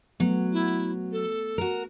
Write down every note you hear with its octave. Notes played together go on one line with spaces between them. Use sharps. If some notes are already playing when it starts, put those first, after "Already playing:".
F#3 A3 B3
E4
A4
F#4 A#4